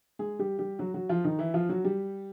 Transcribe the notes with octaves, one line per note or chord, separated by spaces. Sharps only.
G#3 G#4
G3 G4
G3 G4
F#3 F#4
F#3 F#4
F3 F4
D#3 D#4
E3 E4
F3 F4
F#3 F#4
G3 G4